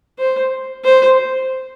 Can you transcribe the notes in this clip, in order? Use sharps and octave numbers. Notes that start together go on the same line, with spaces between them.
C5
C5